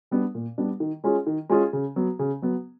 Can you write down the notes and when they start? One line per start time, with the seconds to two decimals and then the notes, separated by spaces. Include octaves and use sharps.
0.11 G3 B3 D4
0.35 A#2
0.58 G3 B3 D4
0.80 D#3
1.04 G#3 C#4 F4 G#4
1.27 D#3
1.50 G#3 C#4 F4 G#4
1.73 C#3
1.96 F#3 B3
2.19 C#3
2.42 F#3 B3